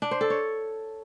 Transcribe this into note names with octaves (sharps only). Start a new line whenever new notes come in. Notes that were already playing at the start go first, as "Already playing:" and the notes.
D4
C5
A4
C#5